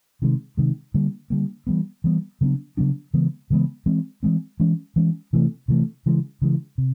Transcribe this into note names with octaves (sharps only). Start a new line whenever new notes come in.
C3 D#3 G#3
C3 D#3 G#3
D3 G3 A#3
D3 G3 A#3
E3 G3 B3
E3 G3 B3
C#3 F#3 B3 D4
C#3 F#3 B3 D4
C#3 E3 G#3 B3
C#3 E3 G#3 B3
E3 G#3 C4
E3 G#3 C4
E3 G#3 C#4
E3 G#3 C#4
C3 E3 A3
C3 E3 A3
C#3 E3 G#3
C#3 E3 G#3
C3